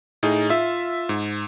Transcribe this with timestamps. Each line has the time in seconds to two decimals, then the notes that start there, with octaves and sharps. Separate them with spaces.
0.23 A2 D#4 G#4
0.50 F4 E5
1.09 G#2